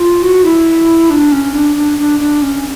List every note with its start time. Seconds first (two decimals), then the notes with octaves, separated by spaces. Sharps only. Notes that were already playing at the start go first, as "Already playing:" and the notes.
Already playing: F4
0.22 F#4
0.44 E4
1.10 D4
1.32 C#4
1.54 D4
1.76 D4
1.99 D4
2.20 D4
2.42 C#4